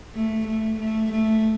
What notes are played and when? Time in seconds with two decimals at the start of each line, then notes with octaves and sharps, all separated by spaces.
0.15 A3
0.47 A3
0.80 A3
1.12 A3